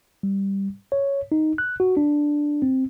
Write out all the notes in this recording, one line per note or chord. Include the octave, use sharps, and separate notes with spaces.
G3
C#5
D#4
F#6
F#4
D4
C4